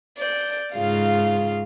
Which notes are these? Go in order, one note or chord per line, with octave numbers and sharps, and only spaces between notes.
D5 G6
G#2 C#3 F4 F5